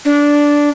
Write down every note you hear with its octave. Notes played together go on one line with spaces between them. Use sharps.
D4